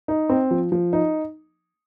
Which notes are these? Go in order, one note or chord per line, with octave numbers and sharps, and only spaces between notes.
D#4
C4
F3
F3
D#4